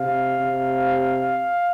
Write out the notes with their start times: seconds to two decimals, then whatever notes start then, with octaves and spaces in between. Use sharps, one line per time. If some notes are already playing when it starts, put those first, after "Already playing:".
Already playing: C3 F5
0.41 C3